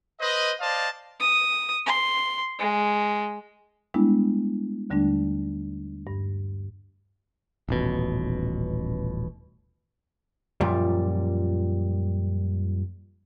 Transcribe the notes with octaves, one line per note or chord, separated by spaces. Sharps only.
B4 C5 D#5
C5 D5 D#5 F5 A5
D#6
C6
G#3
G3 G#3 B3 D4 E4
D#2 D3 G3 A3 D4
G2
D#1 A1 B2
F#2 A#2 F3 G3